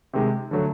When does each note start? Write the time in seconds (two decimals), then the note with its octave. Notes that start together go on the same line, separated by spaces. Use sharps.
0.13 C3 D#3 G#3
0.51 D3 F#3 A3